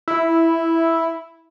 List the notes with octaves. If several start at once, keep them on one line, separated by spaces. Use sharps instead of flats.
E4